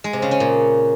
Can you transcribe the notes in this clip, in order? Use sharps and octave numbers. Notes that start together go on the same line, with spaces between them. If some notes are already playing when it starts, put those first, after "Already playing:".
G#3
C3
C#3
C#4
A#2